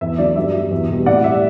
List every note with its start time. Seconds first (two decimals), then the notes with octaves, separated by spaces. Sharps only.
0.01 E2 E5
0.18 D3 F#3 D5
0.36 G2 E5
0.54 F#3
0.71 E2
0.89 B2 G3
1.06 A2 D5 F#5
1.24 G3 E5